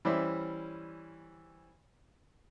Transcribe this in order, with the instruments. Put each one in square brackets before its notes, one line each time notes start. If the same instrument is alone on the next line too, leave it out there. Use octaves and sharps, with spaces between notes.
[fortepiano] E3 G3 C#4 C5 D5 E5